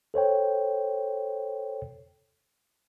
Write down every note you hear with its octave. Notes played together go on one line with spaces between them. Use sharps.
A4 C5 C#5 G5